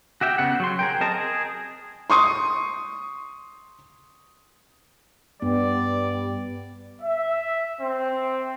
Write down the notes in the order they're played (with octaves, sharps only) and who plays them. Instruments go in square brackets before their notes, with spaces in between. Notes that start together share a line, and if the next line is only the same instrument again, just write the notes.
[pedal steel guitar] F#4 G4 E5 G5
C#3 B3 F#5
F#3 C6
G#4 A#4 G5
C4 A#4 D#5 A5 A#5
G#4
[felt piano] C6 C#6 D#6
[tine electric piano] G2 [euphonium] G3 [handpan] B3 [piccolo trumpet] D5
[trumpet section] E5
C4